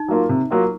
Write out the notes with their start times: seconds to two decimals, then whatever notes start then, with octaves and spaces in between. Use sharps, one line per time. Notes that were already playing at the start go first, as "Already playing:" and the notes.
Already playing: D#4
0.08 F#3 A#3 F4
0.29 C3
0.51 F#3 A#3 F4